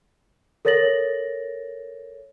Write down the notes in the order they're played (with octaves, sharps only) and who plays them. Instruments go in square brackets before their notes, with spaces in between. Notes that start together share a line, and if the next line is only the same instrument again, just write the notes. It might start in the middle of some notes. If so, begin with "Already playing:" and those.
[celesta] A4 A#4 C#5 A6 A#6 F#7